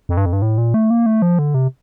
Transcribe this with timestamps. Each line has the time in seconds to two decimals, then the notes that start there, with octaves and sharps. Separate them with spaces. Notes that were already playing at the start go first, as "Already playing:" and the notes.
0.09 F2
0.17 G2
0.26 F2
0.33 G2
0.42 A2
0.58 A#2
0.74 A3
0.90 A#3
1.06 A3
1.22 F3
1.39 D3
1.54 C3